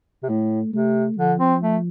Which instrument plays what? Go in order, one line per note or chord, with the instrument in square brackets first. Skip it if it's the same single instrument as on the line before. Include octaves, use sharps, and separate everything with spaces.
[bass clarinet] C3
[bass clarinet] A2 [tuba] A3
[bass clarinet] C3 [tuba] A3
[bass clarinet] D3 [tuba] F3
[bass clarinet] C4
A3